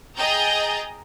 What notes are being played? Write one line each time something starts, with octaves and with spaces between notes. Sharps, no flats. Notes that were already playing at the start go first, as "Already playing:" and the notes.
G#4 D#5 G5 A#5 G6 A6